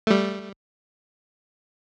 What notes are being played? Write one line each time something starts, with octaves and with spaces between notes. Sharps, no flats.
G3 A3